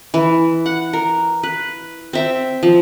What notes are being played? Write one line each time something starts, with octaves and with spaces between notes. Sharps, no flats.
E3
F#5
A#4
B4
C4 E5 G5
F3